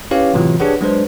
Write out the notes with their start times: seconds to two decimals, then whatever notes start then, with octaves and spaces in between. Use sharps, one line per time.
0.11 C#4 E4 G4 B4 C#5 F5
0.34 A2 C3 E3 F#3 F4
0.60 D4 G4 G#4 B4 C#5 F#5
0.81 F#3 G#3 D4 B4 C5